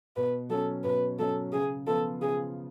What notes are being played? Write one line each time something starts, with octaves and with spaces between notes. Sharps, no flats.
B2 B4
F#3 C#4 A4
B2 B4
F#3 C#4 A4
C#3 G#4
F3 B3 F4 A4
C#3 G#4